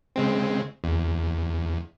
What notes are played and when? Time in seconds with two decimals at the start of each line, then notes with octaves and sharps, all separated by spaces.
0.16 C#3 G#3 C4
0.84 E2